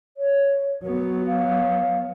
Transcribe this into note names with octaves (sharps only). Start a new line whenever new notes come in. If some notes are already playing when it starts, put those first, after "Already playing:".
C#5
F#3 B3 F#4
F5